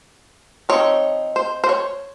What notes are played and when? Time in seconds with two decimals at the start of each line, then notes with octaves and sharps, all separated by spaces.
0.69 F3 C4 D#4 C#5
1.36 C5
1.64 C5
1.69 C#5